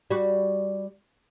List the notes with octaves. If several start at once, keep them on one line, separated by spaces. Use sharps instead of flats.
G3 F#4